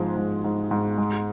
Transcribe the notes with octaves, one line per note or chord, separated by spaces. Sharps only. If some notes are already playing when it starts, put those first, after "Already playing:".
Already playing: G#2 F3 G#3
G#2
G#2
G#2
G#3